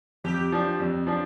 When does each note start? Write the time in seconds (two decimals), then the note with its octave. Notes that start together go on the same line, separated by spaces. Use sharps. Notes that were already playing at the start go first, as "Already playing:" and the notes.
0.24 F2 G4
0.52 F3 D4
0.80 F2
1.07 F3 D4